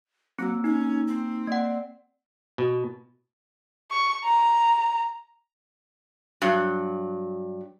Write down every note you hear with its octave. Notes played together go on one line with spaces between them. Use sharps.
F#3 A#3 C4 E6
C#4 D#4
C4
A#3 D5 F#5
B2
C#6
A#5
G2 F#3